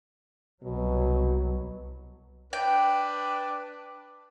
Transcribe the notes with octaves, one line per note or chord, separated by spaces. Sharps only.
C2 B2 F#3
D4 B4 D5 G5